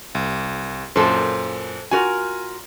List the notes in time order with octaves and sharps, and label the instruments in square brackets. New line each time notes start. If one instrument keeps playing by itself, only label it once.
[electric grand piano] C2
[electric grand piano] F#2 A#2 [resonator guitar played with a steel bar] A4 C5
[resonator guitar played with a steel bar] F4 F#4 A#4 [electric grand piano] G#5